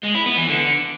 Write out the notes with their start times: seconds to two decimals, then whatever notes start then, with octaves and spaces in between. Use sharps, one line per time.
0.03 G#3
0.15 E4
0.26 B3
0.38 E3
0.49 D3